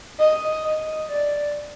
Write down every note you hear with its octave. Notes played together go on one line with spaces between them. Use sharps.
D#5
D#5
D5